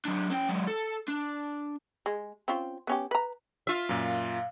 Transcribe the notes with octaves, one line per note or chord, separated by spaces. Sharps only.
F#3 D4
C#4 G5
F#3 G#3
A4
D4
G#3
C4 C#4 F4
B3 C#4 G4
B4 A#5
F4 E5
F#2 A#2 F5